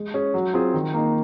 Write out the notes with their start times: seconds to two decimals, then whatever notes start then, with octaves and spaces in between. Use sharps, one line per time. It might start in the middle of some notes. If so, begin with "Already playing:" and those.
Already playing: G#3
0.14 C#4 G#4
0.34 F#3
0.54 C4 F4 G#4
0.74 D#3
0.94 A#3 D#4